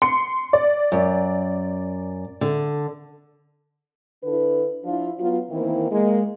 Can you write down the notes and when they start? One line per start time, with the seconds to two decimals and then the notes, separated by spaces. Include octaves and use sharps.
0.02 C6 C#7
0.53 D5
0.92 F#2
2.41 D3
4.24 D3 D4 E4 A4 B4
4.85 F3 D4 E4 F4
5.20 F#3 B3 F4
5.50 D#3 E3 A#3 C4 E4
5.90 G#3 A#3